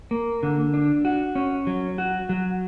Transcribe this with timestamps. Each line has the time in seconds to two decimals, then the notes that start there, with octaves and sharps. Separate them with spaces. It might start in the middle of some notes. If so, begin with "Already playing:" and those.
0.11 A#3
0.43 D3
0.74 D4
1.05 F#4
1.36 C#4
1.67 F#3
1.98 F#4
2.29 F#3